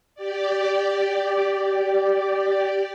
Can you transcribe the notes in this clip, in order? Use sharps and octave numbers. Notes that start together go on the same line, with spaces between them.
G4 D5